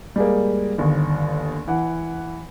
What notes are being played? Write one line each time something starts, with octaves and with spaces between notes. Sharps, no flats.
G3 G#3 A#3
G1 D#2
E3 F#5